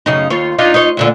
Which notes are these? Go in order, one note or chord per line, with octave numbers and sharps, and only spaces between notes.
F#2 C#3 D#4
D#2 F4 C#5
D4 D#4 F4
D#4 F4 C#5
D2 A#2 D3